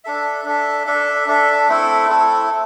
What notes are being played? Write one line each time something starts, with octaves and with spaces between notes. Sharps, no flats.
D4 A4 E5
D4 A4 E5
D4 A4 E5
D4 A4 E5
A3 C4 E4 A4
A3 C4 E4 A4